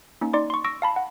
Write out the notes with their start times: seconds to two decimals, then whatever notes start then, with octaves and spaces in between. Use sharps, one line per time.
0.21 A#3 C#4 D#4
0.33 D#4 D5 C6 D6
0.50 C6 C#6
0.64 C#6 E6 A#6 D7
0.82 F5 A5 B5
0.96 F#5